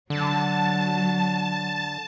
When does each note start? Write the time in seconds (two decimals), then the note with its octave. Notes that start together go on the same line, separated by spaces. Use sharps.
0.10 D3 F#3 A5